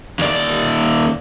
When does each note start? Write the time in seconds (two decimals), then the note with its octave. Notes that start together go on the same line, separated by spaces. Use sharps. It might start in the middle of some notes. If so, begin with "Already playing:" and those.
0.19 D#2 D5